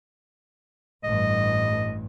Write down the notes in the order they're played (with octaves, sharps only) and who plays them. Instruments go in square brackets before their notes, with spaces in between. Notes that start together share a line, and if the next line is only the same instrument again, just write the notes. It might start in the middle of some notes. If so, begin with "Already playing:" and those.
[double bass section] A1 G2 [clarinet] D#5